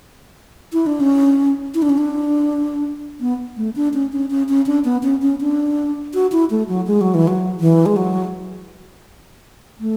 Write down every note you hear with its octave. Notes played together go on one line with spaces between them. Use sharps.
E4
D4
C#4
E4
D4
C#4
D4
B3
A3
D4
C#4
C#4
C#4
C#4
D4
B3
C#4
C#4
D4
F#4
E4
A3
F#3
G#3
F#3
E3
F#3
E3
G#3
F#3
A3